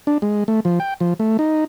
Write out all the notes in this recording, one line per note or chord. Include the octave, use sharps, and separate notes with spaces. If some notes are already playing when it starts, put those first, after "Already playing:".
D4
G#3
A3
F3
G5
F3
A3
D#4